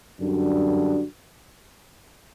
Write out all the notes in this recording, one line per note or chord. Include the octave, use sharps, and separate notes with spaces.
F#2 D3 G3 D4 F#4